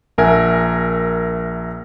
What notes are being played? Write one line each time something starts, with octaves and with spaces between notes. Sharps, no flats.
A#1 A#4 E5 G#5